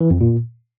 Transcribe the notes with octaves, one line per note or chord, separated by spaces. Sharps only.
E3
F2
A#2